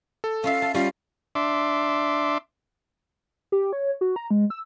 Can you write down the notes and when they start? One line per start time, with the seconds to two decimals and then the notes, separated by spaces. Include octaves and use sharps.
0.24 A4
0.44 C#4 F4 E5 F5
0.62 A5
0.74 G3 C#4 F4 F5
1.35 D4 E5 C6 D6
3.52 G4
3.73 C#5
4.01 F#4
4.16 A#5
4.31 G#3
4.50 E6